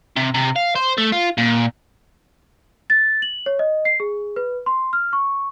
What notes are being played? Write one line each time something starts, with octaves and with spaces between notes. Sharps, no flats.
C3
C3
F5
C5
A3
F4
A#2
A6
F#7
C#5
D#5
C7
G#4
B4
C6
F6
C#6